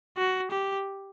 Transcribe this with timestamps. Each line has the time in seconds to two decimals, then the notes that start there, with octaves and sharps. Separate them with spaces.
0.17 F#4
0.51 G4